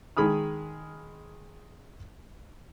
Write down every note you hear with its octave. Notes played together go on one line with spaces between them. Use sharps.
D#3 G#3 G#4 B5 D#6 F6